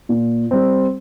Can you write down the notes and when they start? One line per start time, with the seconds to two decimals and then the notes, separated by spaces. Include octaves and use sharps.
0.09 A#2
0.51 G3 C4